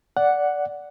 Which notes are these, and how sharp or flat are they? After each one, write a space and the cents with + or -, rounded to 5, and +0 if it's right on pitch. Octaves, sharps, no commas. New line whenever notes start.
D5 -10 F#5 +0